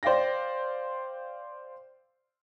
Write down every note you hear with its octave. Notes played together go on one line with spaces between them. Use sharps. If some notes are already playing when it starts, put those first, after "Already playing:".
C5 D5 F5 G5 A#6